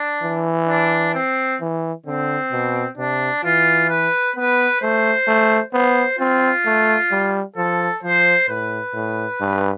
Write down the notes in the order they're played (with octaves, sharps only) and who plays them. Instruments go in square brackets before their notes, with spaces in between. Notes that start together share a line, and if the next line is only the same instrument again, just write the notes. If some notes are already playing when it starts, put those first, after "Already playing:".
Already playing: [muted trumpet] D4
[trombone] E3
[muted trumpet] D4
C4
[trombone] E3
[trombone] D3 [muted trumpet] C4
[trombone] B2
[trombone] C3 [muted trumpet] D4
[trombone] E3 [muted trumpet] F4
[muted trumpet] B4
[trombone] B3 [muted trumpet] B4
[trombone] A3 [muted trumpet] C5
[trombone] A3
[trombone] B3 [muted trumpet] C5
[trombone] C4 [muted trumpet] F4
[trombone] A3
G3
[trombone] F3 [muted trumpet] A4
[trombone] F3 [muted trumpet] C5
[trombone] A2 [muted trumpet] B4
[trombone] A2
G2